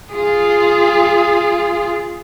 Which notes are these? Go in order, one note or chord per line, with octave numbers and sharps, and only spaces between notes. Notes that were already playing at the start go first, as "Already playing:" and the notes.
F4 G#4